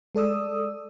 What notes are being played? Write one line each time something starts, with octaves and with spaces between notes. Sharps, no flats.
G#3 A4 D5 D#6 E6